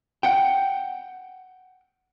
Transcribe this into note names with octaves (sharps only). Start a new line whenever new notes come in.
F#5 G5